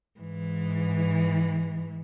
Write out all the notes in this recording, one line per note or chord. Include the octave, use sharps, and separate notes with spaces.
G#2 E3